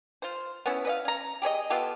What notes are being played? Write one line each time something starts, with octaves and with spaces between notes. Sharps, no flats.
F4 C5
B3 C#4 D4 E4
B4 D#5 F5
C#4 A#5
G4 G#4 C#5 D#5
B3 F4 G4 A4